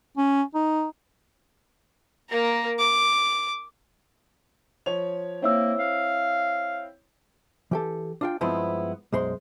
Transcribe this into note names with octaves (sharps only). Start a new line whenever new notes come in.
C#4
D#4
A#3 A#4
D6
F3 C#5 F7
A#3 C4 E4 C#5 E6
F5
E3 G4 A4
D4 F4 G5
G2 F3 G#3 B3 C4 E4
B1 F#2 G#3 C5 C6